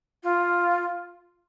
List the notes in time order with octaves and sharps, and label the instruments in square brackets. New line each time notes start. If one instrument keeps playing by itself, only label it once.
[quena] F4